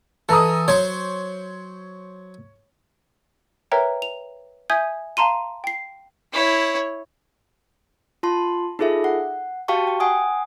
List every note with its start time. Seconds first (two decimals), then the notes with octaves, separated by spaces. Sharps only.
0.29 E3 A4 A#5 D#6
0.68 F#3 C5 C#5
3.72 A#4 B4 C#5 E5 G5 A#5
4.02 F7
4.70 E5 G#5 D#6 G6 G#6
5.17 F5 A5 A#5 C6 D#7
5.64 G5 C7
6.33 E4 C#5
8.23 F4 A5 C6
8.79 D#4 F4 G#4 A4 E5
9.04 F#5
9.68 F#4 G4 F5 G5 A5 C#6
9.87 G5
10.00 F#5 G#5 D#6